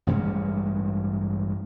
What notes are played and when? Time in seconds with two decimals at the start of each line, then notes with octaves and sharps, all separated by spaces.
0.07 A1 G2 G#3 C#4